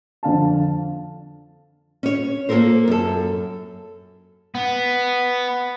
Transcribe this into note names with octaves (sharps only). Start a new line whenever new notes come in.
F2 D3 F5 A5
C#4 C#5
A#3 F4 G4 A4 A#4 C5
F#2 A4
B3